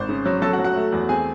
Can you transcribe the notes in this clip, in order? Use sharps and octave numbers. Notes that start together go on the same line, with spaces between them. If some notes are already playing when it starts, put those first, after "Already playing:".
Already playing: G#1 C5
C#3
F#3
F#3 A4 A5
F#4 F#5
F#3
F#4 F#5
A3
E2
C4 G#4 G#5